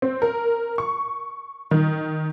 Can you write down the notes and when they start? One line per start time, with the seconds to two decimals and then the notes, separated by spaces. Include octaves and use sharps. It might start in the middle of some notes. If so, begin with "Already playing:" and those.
0.02 C4
0.22 A#4
0.78 C#6
1.71 D#3